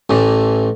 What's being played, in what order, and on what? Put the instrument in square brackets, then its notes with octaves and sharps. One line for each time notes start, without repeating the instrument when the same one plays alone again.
[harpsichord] A1 A2 E3